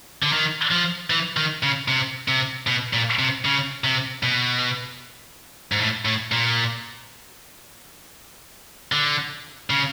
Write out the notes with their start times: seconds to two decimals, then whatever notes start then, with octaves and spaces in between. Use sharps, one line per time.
0.23 D3
0.32 D#3
0.71 F3
1.10 E3
1.37 D#3
1.63 C#3
1.88 C3
2.28 C3
2.67 B2
2.93 A#2
3.19 C3
3.45 C#3
3.84 C3
4.23 B2
5.72 G#2
5.79 A2
6.05 A2
6.32 A#2
8.92 D3
9.70 C#3